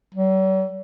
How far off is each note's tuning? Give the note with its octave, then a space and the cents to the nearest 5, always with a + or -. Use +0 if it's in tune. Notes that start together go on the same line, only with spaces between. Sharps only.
F#3 +45